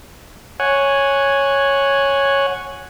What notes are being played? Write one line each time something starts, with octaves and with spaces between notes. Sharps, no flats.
C#5 F#5 G#5